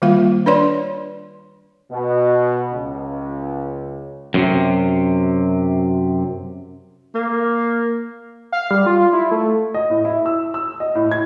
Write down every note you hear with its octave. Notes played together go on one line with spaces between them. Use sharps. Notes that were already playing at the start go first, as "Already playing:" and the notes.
D#3 G3 A#3 F4 F5
D4 B4 C#5 D5 C6
B2
C#2
F#2 A2 C3
A#3
F5
G3
F4
E4
A3
D#5
A2
E4
E6
E6
D#5
A2
G#6